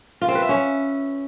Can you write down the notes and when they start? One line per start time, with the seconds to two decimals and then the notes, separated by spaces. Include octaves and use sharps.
0.22 F4
0.28 C4
0.35 B4
0.42 E5
0.49 C#4